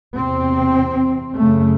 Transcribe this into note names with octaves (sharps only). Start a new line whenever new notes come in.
E2 C3 C4
F#2 C#3 A3